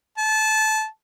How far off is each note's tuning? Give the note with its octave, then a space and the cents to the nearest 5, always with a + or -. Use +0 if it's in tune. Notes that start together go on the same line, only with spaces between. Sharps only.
A5 -20